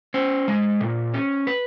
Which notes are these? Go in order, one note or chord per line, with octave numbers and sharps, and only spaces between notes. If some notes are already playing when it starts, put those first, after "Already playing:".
C#4 C5
G#3
A#2
C#4
B4